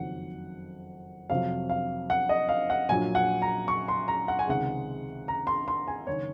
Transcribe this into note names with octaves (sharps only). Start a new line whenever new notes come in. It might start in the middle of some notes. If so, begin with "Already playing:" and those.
Already playing: F#1 F2 D#3 F#3 F#5
F2 C3 F#3 F5
F5
F#5
D#5
F5
F#5
A#1 A#2 F#3 G#5
F#5
A#5
C#6
C6
A#5
F#5
G#5
C#2 C3 D#3 G#3 F#5
A#5
C6
C6
G#5
F#1 D#3 C#5